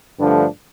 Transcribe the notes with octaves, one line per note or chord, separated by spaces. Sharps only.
G2 D3 F3 A3 D4